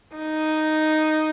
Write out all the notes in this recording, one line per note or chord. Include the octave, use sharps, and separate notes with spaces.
D#4